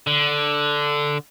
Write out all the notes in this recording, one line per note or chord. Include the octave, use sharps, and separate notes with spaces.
D3